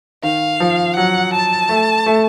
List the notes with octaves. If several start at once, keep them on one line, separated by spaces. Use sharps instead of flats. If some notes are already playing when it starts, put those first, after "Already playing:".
D#3 F5
F3
F#3 F#5
A5
A3
A3